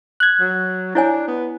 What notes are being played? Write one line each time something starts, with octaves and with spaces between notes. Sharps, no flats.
F#6 G#6
F#3
D4 E4 C#5 G#5
B3